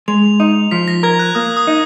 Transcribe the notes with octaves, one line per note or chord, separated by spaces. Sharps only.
G#3 F7
D#4
F3 B6
A#6
A#4 G#6
F#6
A#3 D#6
D#6
D#4